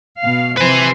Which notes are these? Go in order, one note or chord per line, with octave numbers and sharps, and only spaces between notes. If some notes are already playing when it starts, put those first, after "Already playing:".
B2 F5
C3 F3 B4 C5 G#5